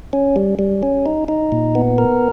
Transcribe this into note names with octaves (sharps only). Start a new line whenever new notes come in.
C#4
G3
G3
C#4
D#4
D#4
A#2
B3
A#4